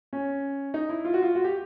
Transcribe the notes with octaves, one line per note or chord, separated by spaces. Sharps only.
C#4
D#4
E4
F4
F#4
F4
F#4
G4